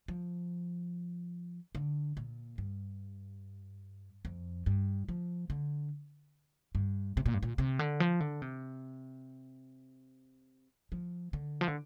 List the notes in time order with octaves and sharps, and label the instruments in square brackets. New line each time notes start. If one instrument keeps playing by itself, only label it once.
[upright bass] F3
D3
A#2
G2
F2
G2
F3
D3
G2
C3
A#2
G2
A#2
C3
D3
F3
D3
C3
F3
D3
F3
D3